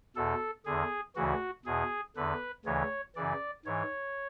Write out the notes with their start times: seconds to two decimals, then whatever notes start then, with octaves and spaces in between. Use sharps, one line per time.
0.16 E2 B2 A4
0.66 E2 D3 G#4
1.16 D2 C#3 E3 F#4
1.66 E2 B2 G#4
2.16 E2 D3 B4
2.65 D2 C#3 E3 C#5
3.16 F#2 C#3 E3 D5
3.65 G#2 E3 C#5